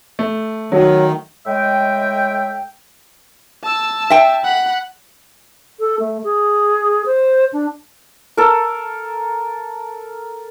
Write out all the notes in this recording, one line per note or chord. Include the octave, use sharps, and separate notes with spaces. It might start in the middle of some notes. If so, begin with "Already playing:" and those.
A3
D#3 F#3
A2 G#3 D#5 E5 G5
A5 E6
E5 G5
F#5 B5
A4
A3
G#4
C5
D4
A4 A#4